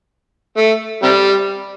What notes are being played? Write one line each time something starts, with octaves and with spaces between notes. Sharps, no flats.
A3
C3 G3